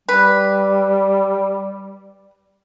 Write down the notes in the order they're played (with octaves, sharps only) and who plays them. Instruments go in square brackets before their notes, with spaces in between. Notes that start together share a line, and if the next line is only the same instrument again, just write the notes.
[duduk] G3 [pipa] B4